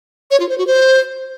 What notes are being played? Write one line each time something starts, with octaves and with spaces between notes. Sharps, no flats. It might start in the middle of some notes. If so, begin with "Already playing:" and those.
C#5
F4
C5
F#4
C5